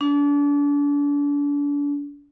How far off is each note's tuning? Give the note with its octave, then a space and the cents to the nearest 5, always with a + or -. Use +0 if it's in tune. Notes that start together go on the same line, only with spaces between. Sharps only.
D4 -35